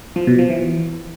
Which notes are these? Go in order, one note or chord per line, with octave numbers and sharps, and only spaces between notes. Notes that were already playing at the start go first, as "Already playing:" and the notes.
F3
B2
F3
E3